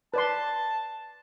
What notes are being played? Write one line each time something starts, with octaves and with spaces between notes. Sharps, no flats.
B4 D5 A5 C6